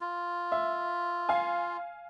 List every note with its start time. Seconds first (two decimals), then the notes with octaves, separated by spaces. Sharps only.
0.01 F4
0.52 E5
1.29 F5 G#5